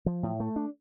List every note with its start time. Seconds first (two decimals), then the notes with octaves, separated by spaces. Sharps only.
0.06 F3
0.23 A2
0.40 A3
0.56 D4